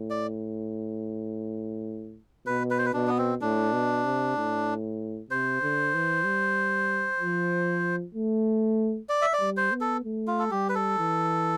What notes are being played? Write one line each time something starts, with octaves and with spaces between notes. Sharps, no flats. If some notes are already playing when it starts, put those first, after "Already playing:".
Already playing: A2
D5
B2 B4
B4
C5
B4
B2 D4
B3
C4
A2 D4
B2
C3
A2
C3 C5
D3
E3
G3
F3
A3
D5
E5
D5
G3
C5
B3
A4
A3
F4
A4
G3 G4
B4
A4
E3